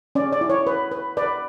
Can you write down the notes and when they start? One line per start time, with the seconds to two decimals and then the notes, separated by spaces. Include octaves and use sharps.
0.15 C#4 D5
0.32 D5
0.41 E4
0.50 C#5
0.67 B4
0.91 B4
1.17 B4 D5